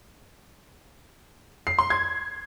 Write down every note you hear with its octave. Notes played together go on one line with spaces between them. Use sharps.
C7
C6
G#6